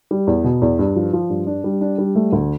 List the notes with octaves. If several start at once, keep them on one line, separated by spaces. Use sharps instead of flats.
G3
E2
B2
E2
G2
F3
F3
G2
D4
G3
D4
G3
A3
D2